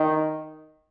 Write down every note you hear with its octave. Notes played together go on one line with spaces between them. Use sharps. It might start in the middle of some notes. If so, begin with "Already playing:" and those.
Already playing: D#3